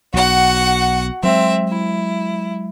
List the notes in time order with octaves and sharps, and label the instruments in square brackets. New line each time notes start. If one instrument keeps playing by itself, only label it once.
[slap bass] B1 [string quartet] F#4 F#5
[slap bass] F#3 G#3 [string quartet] C4 E5
[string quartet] E4